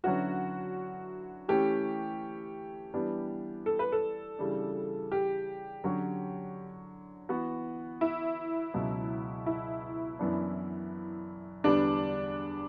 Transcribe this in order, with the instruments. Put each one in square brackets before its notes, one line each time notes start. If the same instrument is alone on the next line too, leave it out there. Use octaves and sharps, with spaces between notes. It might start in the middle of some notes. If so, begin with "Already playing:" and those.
[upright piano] D3 F#3 C#4 E4 B4 [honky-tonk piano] F#4
[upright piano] E3 A3 C#4 [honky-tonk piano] G4
[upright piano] E3 G3 B3 D4
[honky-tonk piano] A4
B4
A4
[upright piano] C#3 E3 G3 D4
[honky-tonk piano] G4
[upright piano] D3 F#3 C#4 F#4
E3 B3 F#4
[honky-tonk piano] E4
[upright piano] C#2 B2 F#3
[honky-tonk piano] E4
[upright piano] F#2 E3 B3 D4
[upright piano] E2 D3 G3 B3 [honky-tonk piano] D4